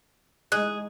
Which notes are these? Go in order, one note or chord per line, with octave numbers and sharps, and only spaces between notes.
E2 G#3 D#4 G#4 D#5 F#6